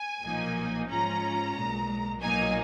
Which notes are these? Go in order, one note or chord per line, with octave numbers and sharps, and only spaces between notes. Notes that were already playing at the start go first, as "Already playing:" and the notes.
Already playing: G#5
B1 A#2 F3 A#3 D#4
G#2 F3 G#3 C#4 F4 A#5
B1 A#2 G#3
B1 A#2 F#3 A#3 D#4 G#5